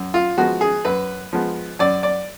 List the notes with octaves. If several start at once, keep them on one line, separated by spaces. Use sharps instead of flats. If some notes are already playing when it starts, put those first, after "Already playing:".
Already playing: F#2
F4
F3 G#3 B3 F#4
G#4
F#2 B4
F3 G#3 B3
F#2 D5
D5